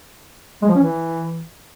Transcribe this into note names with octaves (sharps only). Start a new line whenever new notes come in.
G#3
F3
C#4
E3